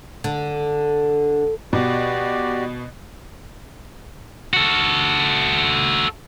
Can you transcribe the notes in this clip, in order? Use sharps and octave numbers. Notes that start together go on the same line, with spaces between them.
D3
B2 F#4 G4 D5
F#4 A4